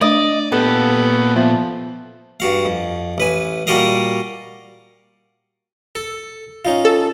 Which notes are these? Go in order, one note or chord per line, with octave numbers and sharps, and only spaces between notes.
A3 D4 D5 D#5
A#2 B3 G4 A4 F#5
F3 B3 E5
G2 F#4 F5
F2
A1 B4 G#5
A#2 G3 F#4 A#4 D#5 F5
A4
C#4 D#4 F4
A4